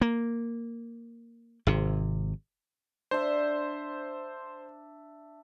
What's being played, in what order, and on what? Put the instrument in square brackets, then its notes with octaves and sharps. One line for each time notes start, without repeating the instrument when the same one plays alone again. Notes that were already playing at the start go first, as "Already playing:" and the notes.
[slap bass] A#3
G#1 C3
[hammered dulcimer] D4 E5 [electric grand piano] C5